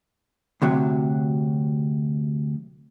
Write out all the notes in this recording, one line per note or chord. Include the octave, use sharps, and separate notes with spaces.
D2 C3 F#3